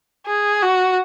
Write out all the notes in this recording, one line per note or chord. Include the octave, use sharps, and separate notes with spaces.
G#4
F#4